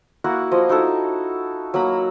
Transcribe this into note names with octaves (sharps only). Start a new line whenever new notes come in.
A#3 E4 F#4 F#5
F3 D#5
D#4 E4 F#4 A4
F#3 A#3 A#5 B5